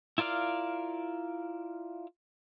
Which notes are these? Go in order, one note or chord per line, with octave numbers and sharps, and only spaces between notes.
E4 F4 A#4 D5 F5